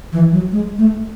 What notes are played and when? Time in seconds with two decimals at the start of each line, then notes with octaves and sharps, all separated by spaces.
0.12 E3
0.32 F#3
0.52 G#3
0.78 A3